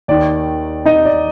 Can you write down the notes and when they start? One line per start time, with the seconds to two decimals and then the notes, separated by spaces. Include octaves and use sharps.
0.08 D#2 D#3 D5
0.86 D#4 D#5
1.05 D5